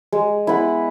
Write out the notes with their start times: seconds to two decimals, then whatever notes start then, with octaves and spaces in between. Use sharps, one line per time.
0.12 G#3
0.47 B3 E4